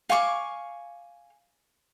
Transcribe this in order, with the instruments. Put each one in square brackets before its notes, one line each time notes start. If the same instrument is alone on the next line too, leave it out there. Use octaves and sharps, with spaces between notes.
[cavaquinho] F5 G#5 C#6 D6